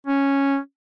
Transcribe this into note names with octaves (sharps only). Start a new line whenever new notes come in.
C#4